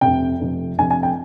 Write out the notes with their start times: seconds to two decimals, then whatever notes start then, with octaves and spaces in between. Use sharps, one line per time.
0.01 F1 F2 C3 G5
0.40 F1 F2 C3
0.78 F1 F2 C3 G#5
0.91 G#5
1.03 G5